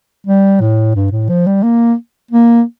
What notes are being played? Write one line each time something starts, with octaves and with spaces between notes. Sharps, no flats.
G3
A2
G2
A2
F3
G3
A#3
A#3